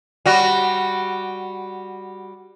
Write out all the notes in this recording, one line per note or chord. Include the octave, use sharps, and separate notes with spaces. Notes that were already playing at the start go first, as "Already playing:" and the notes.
G3 F#4